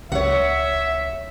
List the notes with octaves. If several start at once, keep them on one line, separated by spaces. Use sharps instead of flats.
C#2 C#5 E5 F#5